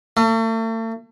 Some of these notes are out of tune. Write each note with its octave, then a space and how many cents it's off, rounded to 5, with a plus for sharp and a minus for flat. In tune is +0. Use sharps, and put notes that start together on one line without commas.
A3 +40